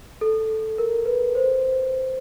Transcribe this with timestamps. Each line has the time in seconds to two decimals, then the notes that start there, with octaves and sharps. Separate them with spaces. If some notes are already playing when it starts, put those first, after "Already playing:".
0.21 A4
0.78 A#4
1.06 B4
1.35 C5